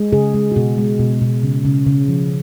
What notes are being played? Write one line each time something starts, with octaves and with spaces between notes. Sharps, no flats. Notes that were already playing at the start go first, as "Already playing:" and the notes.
Already playing: G#3
C#3 G#4
G#3
F#4
B2 G#4
G#3
B2
B2
C#3
C#3
C#3
F3